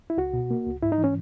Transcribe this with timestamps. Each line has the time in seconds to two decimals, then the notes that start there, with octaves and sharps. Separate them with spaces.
0.10 E4
0.17 C#2 F#4
0.33 B2
0.51 A#3
0.66 C#2
0.82 G#2 E4
0.92 D#4
0.98 E3
1.04 C#4